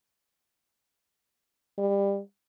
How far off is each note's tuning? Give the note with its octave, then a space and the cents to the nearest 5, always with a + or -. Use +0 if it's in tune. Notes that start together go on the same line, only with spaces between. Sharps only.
G3 +25